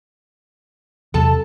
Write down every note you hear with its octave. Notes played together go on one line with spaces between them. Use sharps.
E2 C3 F#3 A4 A5